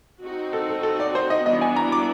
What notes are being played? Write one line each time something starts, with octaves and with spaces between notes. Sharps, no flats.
C4 D#4 F#4
A4
A4
A4
D5
C5
D#5
E3 G3 B3 D4 F#4 D#5
G#5
A#5
D6